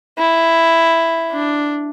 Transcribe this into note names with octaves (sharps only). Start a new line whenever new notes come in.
E4
D4